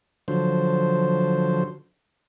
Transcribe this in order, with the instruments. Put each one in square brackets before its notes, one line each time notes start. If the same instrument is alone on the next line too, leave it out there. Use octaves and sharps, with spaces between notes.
[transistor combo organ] D3 F3 F#3 C5